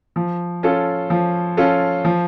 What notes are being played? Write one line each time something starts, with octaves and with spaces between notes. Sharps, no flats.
F3
C#4 F4 A4
F3
C#4 F4 A4
F3